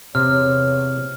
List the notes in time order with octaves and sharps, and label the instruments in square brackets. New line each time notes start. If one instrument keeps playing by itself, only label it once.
[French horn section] E2 C#5 [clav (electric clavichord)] C3 [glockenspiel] F6